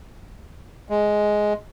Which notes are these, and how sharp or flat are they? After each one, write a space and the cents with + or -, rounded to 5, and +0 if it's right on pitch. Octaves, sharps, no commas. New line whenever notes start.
G#3 +5